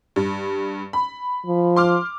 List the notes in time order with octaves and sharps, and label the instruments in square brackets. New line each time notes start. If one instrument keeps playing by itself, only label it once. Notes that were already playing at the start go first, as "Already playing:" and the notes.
[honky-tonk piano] G2
B5
[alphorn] F3
[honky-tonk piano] C6 D6 F6